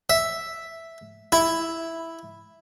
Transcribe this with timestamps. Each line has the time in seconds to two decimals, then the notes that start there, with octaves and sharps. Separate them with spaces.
0.10 E5
1.32 E4